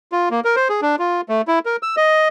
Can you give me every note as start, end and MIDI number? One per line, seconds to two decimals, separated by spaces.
0.12 0.29 65
0.31 0.40 58
0.45 0.56 70
0.56 0.68 72
0.69 0.81 68
0.82 0.96 62
0.99 1.21 65
1.29 1.42 57
1.48 1.59 64
1.66 1.76 70
1.83 1.96 88
1.97 2.28 75